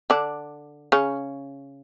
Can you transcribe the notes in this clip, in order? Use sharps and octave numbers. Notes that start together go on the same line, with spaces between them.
D3 D4
C#3 C#4